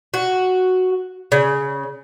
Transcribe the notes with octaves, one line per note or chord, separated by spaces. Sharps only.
F#4
C#3